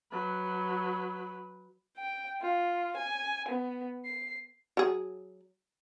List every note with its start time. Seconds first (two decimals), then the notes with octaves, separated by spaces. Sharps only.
0.11 F#3 B4
1.97 G5
2.41 F4
2.97 G#5
3.49 B3
4.05 C7
4.77 F#3 G#4